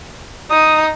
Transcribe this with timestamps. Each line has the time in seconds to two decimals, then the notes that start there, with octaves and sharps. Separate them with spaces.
0.50 D#4 D#6